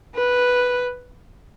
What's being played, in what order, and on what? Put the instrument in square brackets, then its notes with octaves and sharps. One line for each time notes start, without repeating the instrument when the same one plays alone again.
[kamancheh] B4